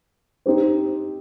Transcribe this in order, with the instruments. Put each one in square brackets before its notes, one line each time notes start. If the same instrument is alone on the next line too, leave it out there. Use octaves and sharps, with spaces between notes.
[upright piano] C4 D#4 G4 C5